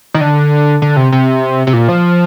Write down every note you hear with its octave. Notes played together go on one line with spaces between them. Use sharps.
D#3
D3
D3
C3
C3
C3
A#2
F3